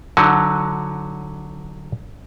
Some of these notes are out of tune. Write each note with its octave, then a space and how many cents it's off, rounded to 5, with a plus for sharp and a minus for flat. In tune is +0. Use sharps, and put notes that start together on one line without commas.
D3 +0 F#3 +0 D#4 +30